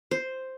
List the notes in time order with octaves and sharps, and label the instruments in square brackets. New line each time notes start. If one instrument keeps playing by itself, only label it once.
[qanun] C5